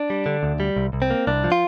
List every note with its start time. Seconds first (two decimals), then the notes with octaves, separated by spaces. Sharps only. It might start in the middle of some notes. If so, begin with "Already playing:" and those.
Already playing: D4
0.10 G3
0.26 D3
0.43 D2
0.60 G3
0.77 C2
0.93 C2
1.02 C4
1.10 A#3
1.27 C2 D4
1.44 F3
1.52 F4